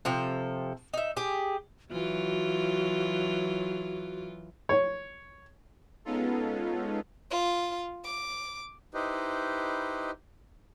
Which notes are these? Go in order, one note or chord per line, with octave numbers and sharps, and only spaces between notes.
C3 F3 A4
D#4 E5
G4 G#4
E3 F#3 F4 F#4
C#5
G#3 B3 C#4 D#4 F4 A4
F4
D6
D#4 E4 G4 B4 C5 D#5